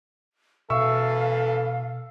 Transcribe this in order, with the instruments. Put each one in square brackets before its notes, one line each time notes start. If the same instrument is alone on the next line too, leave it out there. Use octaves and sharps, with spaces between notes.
[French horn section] F#2 E3 A4 [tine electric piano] B2 [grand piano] E5 C#6 E6 [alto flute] F5